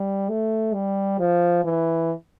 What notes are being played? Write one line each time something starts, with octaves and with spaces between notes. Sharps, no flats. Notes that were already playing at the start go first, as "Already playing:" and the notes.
Already playing: G3
A3
G3
F3
E3